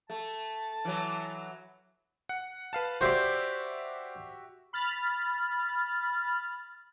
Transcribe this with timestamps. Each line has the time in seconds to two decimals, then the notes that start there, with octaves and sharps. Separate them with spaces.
0.10 A3 A5
0.85 E3 F#3
2.29 F#5
2.73 B4 F5 A5
3.01 F#4 G4 C5 D5 E5
4.73 B5 F6 A6